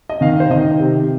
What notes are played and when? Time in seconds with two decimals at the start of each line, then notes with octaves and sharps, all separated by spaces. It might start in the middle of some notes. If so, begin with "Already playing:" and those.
0.10 D#5
0.21 D#3 F5
0.40 C5
0.50 D#3 D#5
0.80 C3